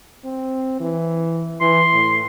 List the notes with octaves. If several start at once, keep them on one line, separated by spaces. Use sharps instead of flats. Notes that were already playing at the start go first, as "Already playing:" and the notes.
C4
E3
E3 C6
A2